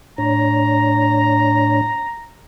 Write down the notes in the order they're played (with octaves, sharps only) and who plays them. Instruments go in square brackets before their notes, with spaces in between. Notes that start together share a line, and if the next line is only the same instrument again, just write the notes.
[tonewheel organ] A2 D4 C#5 [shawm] A#5